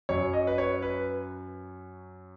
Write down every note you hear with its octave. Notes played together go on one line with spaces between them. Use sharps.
F#2 F#3 C#5
D#5
B4
C#5
B4